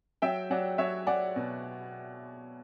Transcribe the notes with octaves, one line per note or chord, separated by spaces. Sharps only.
F#3 E5 G5
F#3 D5 F#5
F#3 C#5 E5
F#3 D5 F#5
B2